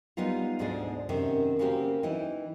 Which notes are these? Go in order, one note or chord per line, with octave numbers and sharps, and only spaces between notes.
G3 G#3 B3 D#4 F4
D2 G#2 B2 D3 G#4 D5
F#2 C3 D#3
C#3 A#3 C4 F#4 G4 A#4
E3 D#4 E4